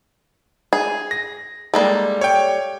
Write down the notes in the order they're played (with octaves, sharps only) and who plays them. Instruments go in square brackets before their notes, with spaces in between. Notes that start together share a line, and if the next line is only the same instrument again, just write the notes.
[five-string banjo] G#4
[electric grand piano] A#6
[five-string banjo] G3 A#3 A4 [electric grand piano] G#3
[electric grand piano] C#5 G5